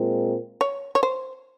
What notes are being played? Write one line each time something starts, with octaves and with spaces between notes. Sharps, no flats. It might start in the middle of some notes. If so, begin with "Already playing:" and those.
Already playing: A#2 G#3 C4 F4 A#4
C#5
C#5
C5